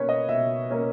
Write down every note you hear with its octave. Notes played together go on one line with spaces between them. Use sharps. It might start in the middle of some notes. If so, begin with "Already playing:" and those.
Already playing: B2 A#3 C#4 B4 C#5
D#5
B2 E5
A#3 C#4